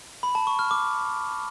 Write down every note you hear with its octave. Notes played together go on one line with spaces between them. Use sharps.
B5
A5
C#6
F6
D6